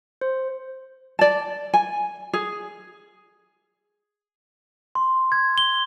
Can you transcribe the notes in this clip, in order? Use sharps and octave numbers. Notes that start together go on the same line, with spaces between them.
C5
D5 A5
G#5
G#4
C6
G#6
G7